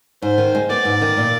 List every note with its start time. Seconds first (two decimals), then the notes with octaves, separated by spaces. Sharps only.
0.22 G#2 C5
0.38 D#3
0.55 G#3
0.70 B3 D5
0.85 G#2
1.01 D#3
1.17 A#2